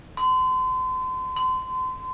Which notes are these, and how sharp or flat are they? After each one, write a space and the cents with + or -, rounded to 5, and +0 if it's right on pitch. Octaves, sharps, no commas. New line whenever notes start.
C6 -35
C6 -30